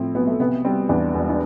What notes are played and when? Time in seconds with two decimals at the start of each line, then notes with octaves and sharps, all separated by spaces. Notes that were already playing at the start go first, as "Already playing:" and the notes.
Already playing: A2 F3 C4 E4
0.15 B1 B3
0.27 A3
0.40 C3 B3
0.65 G3 C4
0.89 E2 D4
1.14 E1
1.29 D4